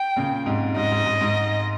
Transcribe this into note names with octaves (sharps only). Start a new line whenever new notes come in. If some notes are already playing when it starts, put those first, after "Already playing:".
Already playing: G5
A#2 C#3
G#2 C3
G#2 D#5
G#2
G#2
G#2